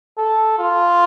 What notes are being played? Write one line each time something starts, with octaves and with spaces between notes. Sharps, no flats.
A4
F4